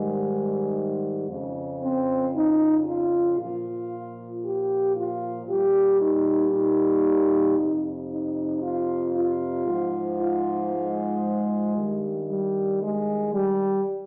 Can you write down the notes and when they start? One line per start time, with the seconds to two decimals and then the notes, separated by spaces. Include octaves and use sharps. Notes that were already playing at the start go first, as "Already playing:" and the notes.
Already playing: G#2 D#3 G3 G#3
1.28 F2 C#3 F3
1.80 C4
2.32 D#4
2.85 F4
3.37 A#2 F3 F4
4.43 G4
4.95 F4
5.47 A#2 G3 G4
6.00 D#4
6.52 D#4
7.57 F2 C3 F3
8.10 D#4
8.61 F4
9.14 F4
9.66 G#2 F3
10.19 F4
10.71 G#3
11.76 G2 D#3 G3
12.28 G3
12.81 G#3
13.34 G3